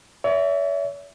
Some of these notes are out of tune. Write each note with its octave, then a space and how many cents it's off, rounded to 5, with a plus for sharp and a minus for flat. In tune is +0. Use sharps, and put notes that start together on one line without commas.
C#5 +45 E5 +0